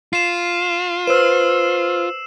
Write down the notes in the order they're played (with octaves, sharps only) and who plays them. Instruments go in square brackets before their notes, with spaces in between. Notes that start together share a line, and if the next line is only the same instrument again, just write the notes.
[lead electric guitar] F4 [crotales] C7 E7
[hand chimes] B4 C5 F6 [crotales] E6 E7